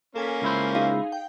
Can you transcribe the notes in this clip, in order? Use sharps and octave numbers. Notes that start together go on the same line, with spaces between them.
A#3 C#4 A4 G#5 B6
C#2 E4 C5
D#4 G#4 F5
G5